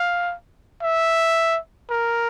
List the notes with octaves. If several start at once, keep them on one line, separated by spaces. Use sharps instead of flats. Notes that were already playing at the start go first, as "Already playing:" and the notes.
Already playing: F5
E5
A#4